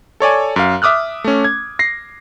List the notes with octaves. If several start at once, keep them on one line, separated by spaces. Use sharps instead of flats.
A4 C#5 D5 G#5
F#2 F5
E5 D6 D#6 F6 F#6
A3 C#4
G#6
A#6 C7